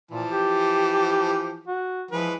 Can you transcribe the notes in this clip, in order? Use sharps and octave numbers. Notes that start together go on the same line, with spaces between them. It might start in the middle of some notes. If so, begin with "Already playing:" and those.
A#2 E3 F3 A5
G4
F#4
E3 F3 G#3 B4